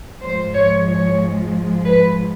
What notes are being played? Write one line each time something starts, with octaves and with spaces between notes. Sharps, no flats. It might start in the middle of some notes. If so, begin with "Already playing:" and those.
G#2 F3 G#3 C5
C#5
C#5
B4